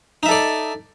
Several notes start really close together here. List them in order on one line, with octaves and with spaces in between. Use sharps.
D#4 E5 A4 D5